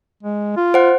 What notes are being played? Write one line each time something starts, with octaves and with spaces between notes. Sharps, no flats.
G#3
F4
C5 F#5